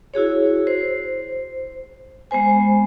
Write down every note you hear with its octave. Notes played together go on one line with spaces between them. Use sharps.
E4 F#4 G#4 C#5
C5
G#3 B3 C5 G#5